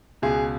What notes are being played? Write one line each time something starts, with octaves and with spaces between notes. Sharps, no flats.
C#2 B2 G#4